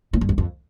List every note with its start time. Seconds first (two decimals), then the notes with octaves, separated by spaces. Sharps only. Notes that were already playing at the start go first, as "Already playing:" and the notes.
0.13 A2
0.21 G2
0.29 E2
0.38 F2